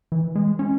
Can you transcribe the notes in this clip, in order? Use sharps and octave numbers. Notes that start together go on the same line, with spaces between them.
E3
G#3
C#4